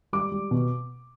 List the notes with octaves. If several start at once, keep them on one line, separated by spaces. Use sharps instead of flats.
G3 D6
G3
B2